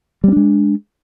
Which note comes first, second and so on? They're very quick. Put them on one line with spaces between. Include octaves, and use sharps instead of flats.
G3 C4 D4 G#3